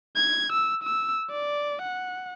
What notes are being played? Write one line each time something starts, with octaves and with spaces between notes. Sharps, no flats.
G#6
E6
E6
D5
F#5